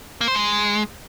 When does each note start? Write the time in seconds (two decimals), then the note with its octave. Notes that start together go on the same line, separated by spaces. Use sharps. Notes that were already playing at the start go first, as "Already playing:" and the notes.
0.21 A#3
0.28 C5
0.35 G#3